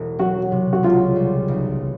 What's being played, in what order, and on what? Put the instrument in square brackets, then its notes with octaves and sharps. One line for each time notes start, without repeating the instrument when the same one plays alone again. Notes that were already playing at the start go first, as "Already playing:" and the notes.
Already playing: [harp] E1
[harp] F#3 [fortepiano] F#4
[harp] C3
[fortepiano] F#4
[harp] C#2 [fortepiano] F4
[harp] G3
B1